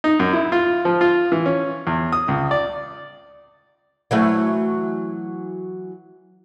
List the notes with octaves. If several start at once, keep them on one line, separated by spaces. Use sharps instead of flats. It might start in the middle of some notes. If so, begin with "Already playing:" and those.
D#4
F#2
E4
F4
F3
F4
E3
C#4
E2
D#6
C#2
D5
E3 F#3 A3